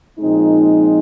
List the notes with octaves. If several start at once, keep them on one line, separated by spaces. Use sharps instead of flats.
A#2 F3 G#3 C4 D#4